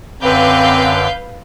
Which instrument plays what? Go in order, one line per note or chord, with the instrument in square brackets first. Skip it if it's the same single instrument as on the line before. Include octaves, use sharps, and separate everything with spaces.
[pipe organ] F#2 D3 D6 [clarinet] C4 [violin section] B4 F5 G6